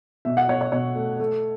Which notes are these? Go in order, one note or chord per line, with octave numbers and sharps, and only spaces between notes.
B2 E5
F#5
B2 C#5
C#5
B2 C#5
A3
A3